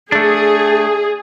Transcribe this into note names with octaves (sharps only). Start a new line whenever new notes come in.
A3 D4 G#4